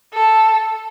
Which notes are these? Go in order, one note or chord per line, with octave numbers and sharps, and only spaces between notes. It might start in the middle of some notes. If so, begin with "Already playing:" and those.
A4